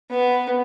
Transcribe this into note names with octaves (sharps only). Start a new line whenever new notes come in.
B3